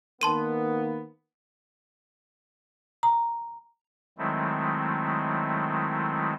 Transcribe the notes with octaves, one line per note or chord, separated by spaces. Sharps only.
D#3 A#3 B3 A5 C6 D#7
A#5
D#3 F#3 G#3 A3 C4 E4